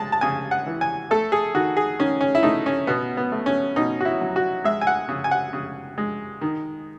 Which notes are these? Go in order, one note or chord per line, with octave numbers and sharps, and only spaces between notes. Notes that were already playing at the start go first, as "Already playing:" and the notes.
Already playing: G#3 A5
A5
C#3 G#5
F#5
E3
G#5
A3 A4
G#4
D#3 F#4
G#4
D#3 C#4
C#4
E4
A3 D#4
C#4
B2 B3
B3
A3
C#4
B2 D#4
F#4
E4
F#3
F#4
G#3 E5
G#5
F#5
C#3
G#5
F#5
C#3
G#3
D#3